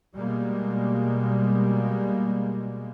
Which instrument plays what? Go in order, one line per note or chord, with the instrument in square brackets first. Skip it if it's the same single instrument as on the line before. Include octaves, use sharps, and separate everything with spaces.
[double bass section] B2 G3 G#3 A#3